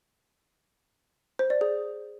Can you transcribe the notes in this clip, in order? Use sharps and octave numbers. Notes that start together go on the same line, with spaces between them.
C5
D5
G#4